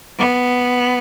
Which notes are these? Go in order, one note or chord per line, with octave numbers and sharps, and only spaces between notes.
B3